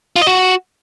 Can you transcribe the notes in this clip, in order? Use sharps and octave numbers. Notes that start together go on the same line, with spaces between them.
F4
D#5
F#4